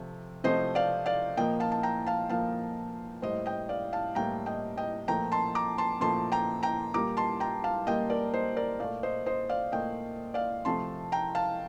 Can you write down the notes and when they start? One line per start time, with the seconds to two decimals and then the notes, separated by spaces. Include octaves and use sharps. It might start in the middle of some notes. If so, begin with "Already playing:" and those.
Already playing: C3 F3 A3
0.44 C3 F3 A3 C5 D#5
0.75 D5 F5
1.06 D5 F5
1.37 A#2 F3 A#3 D#5 G5
1.60 F5 A5
1.72 A5
1.83 G5 A#5
2.06 F5 A5
2.29 A#2 F3 A#3 F5 A5
3.22 A2 G3 A#3 C5 D#5
3.46 D#5 G5
3.69 D5 F5
3.93 F5 A5
4.15 A2 G3 A#3 G5 A#5
4.46 D#5 G5
4.77 D#5 G5
5.08 A#2 F3 A3 G5 A#5
5.32 A5 C6
5.55 A#5 D6
5.78 A5 C6
6.01 A#2 F3 A3 A5 C6
6.32 G5 A#5
6.63 G5 A#5
6.94 A#2 G3 A#3 A#5 D6
7.17 A5 C6
7.40 G5 A#5
7.64 F5 A5
7.87 A#2 G3 A#3 D#5 G5
8.10 A#4 D5
8.34 C5 D#5
8.56 A#4 D5
8.80 A#2 A3 D5 F5
9.03 C5 D#5
9.26 C5 D#5
9.50 D5 F5
9.72 A#2 A3 D#5 G5
10.34 D5 F5
10.65 C3 F3 A3 A5 C6
11.12 G5 A#5
11.35 F5 A5